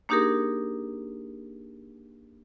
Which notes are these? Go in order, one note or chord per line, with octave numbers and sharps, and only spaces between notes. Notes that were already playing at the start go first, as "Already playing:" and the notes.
A#3 D4 D#4 G4 G#4 A#4